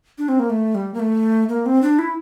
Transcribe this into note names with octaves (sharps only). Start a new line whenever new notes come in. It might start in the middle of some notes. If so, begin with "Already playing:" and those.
D4
C4
A#3
A3
G3
A#3
A3
A#3
C4
D4
E4